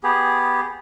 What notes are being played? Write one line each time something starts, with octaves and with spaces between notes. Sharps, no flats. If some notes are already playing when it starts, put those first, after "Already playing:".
B3 G4 G#4